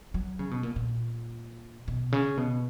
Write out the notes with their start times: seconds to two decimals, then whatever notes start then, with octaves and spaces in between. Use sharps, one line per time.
0.14 F#3
0.39 C#3
0.51 B2
0.63 A#2
0.76 A#2
1.88 B2
2.12 C#3
2.37 B2